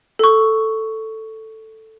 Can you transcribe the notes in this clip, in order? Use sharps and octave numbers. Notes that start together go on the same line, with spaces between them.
A4 C#6